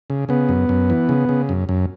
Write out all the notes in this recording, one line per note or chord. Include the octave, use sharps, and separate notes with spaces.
C#3
C#3 B3
F#2
F#2
E3
C#3
C#3
F#2
F#2